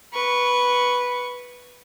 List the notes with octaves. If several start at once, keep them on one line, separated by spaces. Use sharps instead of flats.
B4 C#6